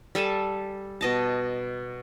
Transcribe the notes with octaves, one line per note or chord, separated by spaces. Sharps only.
G3 A4 G#5 A5
B2 D#5 A5